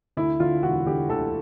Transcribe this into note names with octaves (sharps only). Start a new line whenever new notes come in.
D2 E4
D3 F4
E1 F#4
D3 G4
D2 A4